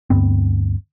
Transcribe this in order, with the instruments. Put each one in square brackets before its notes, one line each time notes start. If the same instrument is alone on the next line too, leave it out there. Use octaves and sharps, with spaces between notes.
[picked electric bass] D2 G2 B3 C4